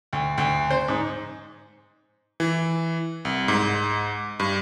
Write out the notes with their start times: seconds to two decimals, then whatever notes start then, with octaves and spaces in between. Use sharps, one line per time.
0.13 D2
0.38 D2
0.70 C5
0.88 G#2
2.40 E3
3.25 C2
3.48 G#2
4.40 G2